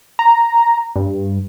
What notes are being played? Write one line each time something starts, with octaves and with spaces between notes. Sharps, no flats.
A#5
G2